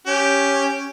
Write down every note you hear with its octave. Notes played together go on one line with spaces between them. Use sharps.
C#4 G4